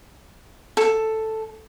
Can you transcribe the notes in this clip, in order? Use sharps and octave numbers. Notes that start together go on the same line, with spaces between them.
A4